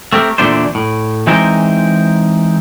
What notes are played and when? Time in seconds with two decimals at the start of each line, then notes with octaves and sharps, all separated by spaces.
0.13 A3 C4 G4 A#4
0.38 E2 A#2 D3 A3 D4 C5
0.75 A2
1.27 E3 G#3 C4 D#4 A#4 C5